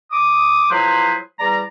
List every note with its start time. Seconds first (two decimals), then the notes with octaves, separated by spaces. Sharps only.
0.11 D6 D#6
0.71 F3 F#3 E4 G#4 B4 C5
1.39 E2 G3 D5 A#5